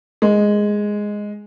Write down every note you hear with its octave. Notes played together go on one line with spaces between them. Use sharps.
G#3